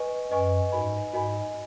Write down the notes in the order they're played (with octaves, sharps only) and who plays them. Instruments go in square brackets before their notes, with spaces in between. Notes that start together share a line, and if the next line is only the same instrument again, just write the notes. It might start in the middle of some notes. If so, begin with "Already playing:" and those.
Already playing: [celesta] B4 D#5 G#5 C#6
[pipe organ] F#2 [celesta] B4 D#5 G#5 C#6
[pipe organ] G#2 [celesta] F#4 A#4 D#5 G#5 B5
[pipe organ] G#2 [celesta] F#4 A#4 D#5 G#5 B5